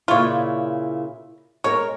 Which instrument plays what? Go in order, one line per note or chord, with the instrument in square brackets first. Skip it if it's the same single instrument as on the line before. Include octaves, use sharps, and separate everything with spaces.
[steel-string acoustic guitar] A#2 C#3 E4 [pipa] F4 C#5
[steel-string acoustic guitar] G#3 A#4 [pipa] C#5